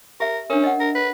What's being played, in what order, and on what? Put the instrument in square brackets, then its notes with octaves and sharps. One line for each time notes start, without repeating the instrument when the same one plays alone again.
[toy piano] G4 E5 [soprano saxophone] A#4
[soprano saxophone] C#4 [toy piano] D4 A#4
[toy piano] D#5 F#5
[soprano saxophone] A#4
B4